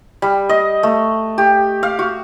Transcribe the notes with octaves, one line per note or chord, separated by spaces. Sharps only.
G3
D#5
A3
G4
F5
F#4